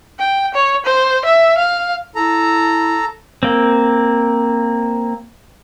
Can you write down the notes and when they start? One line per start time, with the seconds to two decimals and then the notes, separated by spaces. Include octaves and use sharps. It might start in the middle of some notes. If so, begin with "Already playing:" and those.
0.19 G5
0.54 C#5
0.85 C5
1.25 E5
1.58 F5
2.16 E4 A4 A#5
3.43 A#3 C4